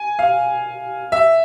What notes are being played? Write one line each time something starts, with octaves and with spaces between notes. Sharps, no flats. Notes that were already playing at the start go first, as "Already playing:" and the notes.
Already playing: G#5
F5
E5